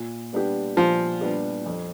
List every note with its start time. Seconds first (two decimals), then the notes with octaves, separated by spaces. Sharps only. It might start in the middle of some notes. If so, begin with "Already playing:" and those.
Already playing: A#2
0.33 G3 B3 D4 G4
0.77 A#2 F3
1.21 G3 B3 D4 G4
1.66 F2